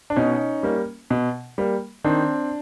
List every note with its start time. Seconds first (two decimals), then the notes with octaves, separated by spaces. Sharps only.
0.10 D4
0.16 B2 C#4 D#4
0.63 G3 A#3
1.10 B2
1.58 G3 A#3
2.04 D#3 C4 D4